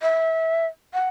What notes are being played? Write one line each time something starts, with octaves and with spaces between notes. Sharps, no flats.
E5
F#5